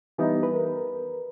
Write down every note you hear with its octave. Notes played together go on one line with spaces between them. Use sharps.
E3 G3 B3 D#4 B4
B4
A#4